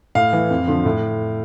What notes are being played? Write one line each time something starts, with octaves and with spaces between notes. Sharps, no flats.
A2 F5
E3
F2
D3 F3
A2